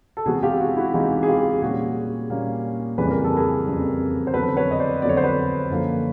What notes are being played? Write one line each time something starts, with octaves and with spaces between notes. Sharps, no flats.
A4
C3 E3 G#3 B3 F#4 G#4
F4 G4
F#4 G#4
E4 F#4
C3 E3 G#3 B3 D#4 F4
G#4
F4 G4
A#2 G3 A#3 C#4 F#4 G#4
A#2 G3 A#3 C#4
F2 C#3 E3 G3 B4
A#4
A4
G#4 A#4
F2 C#3 E3 G3
C5
F2 D3 F#3 B3 A4 B4
B4 C#5
D#5
C5 D5
F2 D3 F#3 B3 D5
C#5
C5
B4 C#5
F#2 D3 F3 A#3